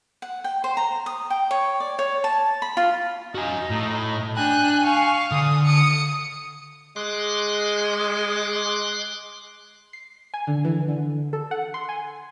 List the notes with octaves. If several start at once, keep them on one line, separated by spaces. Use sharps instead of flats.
F#5
G5
C5
A#5
D#6
G5
C#5
D5
C#5
A5
B5
F4
D#4 F#4 G#5
A2
D4 G5 G#5 F#6
F5 C#6
D3 D#6
D#6 C#7
G#3 C6 D6 F#6
C7
G#5
D3
E3
D3
A4
F#5
C6
G#5